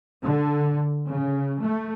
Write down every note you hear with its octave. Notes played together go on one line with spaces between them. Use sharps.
D3
C#3
A3